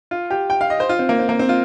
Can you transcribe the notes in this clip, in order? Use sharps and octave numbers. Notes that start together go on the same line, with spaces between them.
F4
G4
G5
F5
D#5
C5
F4
C4
A#3
C4
A#3
C4
F4